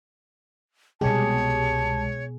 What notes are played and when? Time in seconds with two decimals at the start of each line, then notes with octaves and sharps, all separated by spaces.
1.01 C2 B2 G#3 G4 G#4 C#5 A5